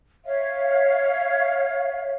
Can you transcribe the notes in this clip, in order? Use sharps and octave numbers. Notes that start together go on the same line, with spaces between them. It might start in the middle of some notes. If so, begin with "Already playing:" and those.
C#5 E5 F5